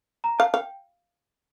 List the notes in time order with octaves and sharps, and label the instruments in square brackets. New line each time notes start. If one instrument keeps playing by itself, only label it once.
[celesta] A#5
[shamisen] F5 [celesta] A5
[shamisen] F5 [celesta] G5